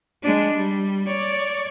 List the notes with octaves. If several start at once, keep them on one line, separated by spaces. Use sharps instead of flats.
G#3 D4
G3
C#5 D5